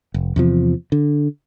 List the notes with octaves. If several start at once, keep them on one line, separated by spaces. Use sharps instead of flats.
F1
E2 C3 F3
D3